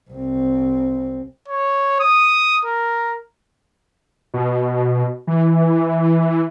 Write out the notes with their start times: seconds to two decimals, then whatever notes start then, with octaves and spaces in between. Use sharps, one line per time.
0.11 C2 C4
1.48 C#5
2.00 D#6
2.66 A#4
4.34 B2
5.27 E3